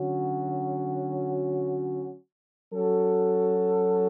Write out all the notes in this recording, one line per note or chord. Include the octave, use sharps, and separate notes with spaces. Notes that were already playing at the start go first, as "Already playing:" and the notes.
Already playing: D3 F#3 C#4 F#4
F#3 C#4 F#4 A4